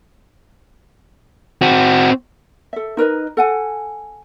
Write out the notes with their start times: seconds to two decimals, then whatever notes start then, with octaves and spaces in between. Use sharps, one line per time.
1.62 C4 F#4
2.73 A4 E5
2.97 D#4 A#4 B4 D#5
3.37 A4 F#5 G#5